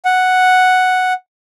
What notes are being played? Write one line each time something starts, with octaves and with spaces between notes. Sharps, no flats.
F#5